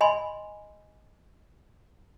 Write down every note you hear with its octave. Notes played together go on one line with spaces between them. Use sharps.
D#5 G#5 B5 C6